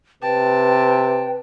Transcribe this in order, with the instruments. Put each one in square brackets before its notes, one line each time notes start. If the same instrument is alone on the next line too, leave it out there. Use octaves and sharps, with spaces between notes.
[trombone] C3 [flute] B4 [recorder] G5 [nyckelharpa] A5